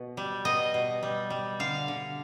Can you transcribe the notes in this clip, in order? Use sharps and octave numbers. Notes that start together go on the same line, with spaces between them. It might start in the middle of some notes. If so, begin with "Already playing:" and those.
Already playing: B2
G3
B2 D#5
B2
G3
G3
D3 F5
D3